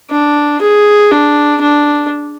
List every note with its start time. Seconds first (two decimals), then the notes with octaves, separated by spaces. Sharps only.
0.10 D4
0.61 G#4
1.11 D4
1.62 D4